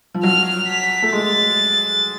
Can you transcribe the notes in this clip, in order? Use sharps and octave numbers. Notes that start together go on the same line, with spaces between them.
F3
F#3 F6
B6
A3
G#3 A6